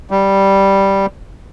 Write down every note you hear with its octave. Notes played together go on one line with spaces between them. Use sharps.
G3